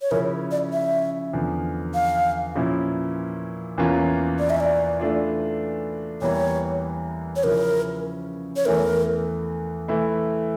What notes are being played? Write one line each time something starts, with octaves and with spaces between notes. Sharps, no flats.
C#5
C#3 F3 C#4 E4 A#4
D5
E5
E2 D3 F3
F5
A#2 F3 C#4 E4
E2 E3 A#3 C#4 F4
D5
E5
D5
E3 A3 D4 F4
E2 E3 G3 A#3 C#5
C#5
C#3 F3 C#4 E4 A#4
C#5
E2 E3 A3 A#4
E3 A3 E4